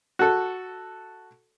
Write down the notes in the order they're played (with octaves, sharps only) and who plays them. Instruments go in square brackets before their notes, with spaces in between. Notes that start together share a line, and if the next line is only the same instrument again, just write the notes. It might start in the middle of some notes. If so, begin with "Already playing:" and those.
[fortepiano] F#4 A4